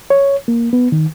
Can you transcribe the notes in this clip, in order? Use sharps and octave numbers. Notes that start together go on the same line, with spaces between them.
C#5
A#3
B3
D#3